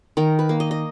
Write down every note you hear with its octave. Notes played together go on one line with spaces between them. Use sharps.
D#3 A#4
B4
A#3
D#5
D#5